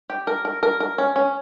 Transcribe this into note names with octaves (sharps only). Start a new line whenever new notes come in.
G4
A#4
A#4
A#4
A#4
C#4
C#4